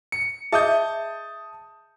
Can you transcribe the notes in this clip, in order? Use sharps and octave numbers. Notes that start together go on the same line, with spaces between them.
C#7
G#4 D#5 E5 A5 D#6 G6